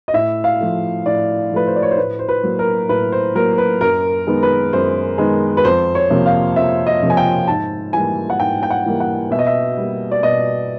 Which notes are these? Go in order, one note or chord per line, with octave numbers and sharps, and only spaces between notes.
D#5
A2 E5
F5
F3 A3
A2 D5
F3 A3 B4
C5
D5
C#5
C5
A2 B4
C5
B4
F#3 A#3
A#4
A2 B4
C5
F#3 A#3 A#4
B4
F#2 A#4
D#3 G#3 B3
B4
F#2 C5
D#3 G#3 B3
B4
F2 C5
C#5
C3 F3 A#3
F5
F2 E5
D#5
C3 F3 A#3
G#5
G5
G#2 A5
E3 G3 A#3 G#5
F#5
G#2 G5
G5
F#5
E3 G3 A#3
F#5
B2 E5
D#5
E5
G3 A#3
D5
B2 D#5